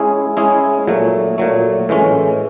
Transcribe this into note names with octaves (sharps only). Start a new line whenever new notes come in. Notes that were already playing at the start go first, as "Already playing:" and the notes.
Already playing: G#3 C#4 E4 G#4
G#3 C#4 E4 G#4
A#2 F#3 A3
A#2 F#3 A3
A2 E3 G#3 C#4